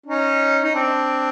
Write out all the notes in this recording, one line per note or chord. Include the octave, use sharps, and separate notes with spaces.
C#4 D#4
D#4
C4 D4